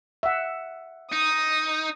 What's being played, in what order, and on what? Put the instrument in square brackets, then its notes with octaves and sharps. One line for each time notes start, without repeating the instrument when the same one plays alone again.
[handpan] E5 F#5
[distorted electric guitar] D#4 [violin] D#6